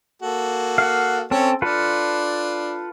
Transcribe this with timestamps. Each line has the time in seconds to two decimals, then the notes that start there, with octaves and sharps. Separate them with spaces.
0.22 A#3 F#4 A4
0.78 F5 F#5
1.31 C4 C#4 A4 C#5
1.62 D4 F4 A4 B4